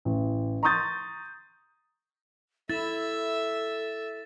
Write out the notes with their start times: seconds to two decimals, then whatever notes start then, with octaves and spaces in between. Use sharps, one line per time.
0.05 A1
0.63 A#5 C6 C#6 D#6 G6 A6
2.70 E4 A4 E5 A6